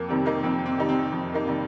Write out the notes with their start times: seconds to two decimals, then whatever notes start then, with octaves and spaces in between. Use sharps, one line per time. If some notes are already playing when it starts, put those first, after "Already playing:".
Already playing: F2 A#3
0.09 C3 D#3 G3 C4
0.26 A#3 D#4
0.44 F2 C4
0.66 C4
0.78 C3 D#3 G3 D#4
0.89 C4
1.11 F2
1.34 A#3 D#4
1.46 C3 D#3 G3